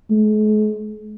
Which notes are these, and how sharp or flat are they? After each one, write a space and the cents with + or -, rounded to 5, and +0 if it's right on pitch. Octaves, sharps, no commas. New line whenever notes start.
G#3 +45